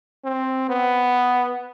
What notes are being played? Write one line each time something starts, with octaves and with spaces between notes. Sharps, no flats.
C4
B3